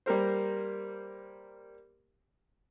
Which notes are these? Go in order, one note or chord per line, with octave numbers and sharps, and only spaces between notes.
G3 A#3 A#4 C5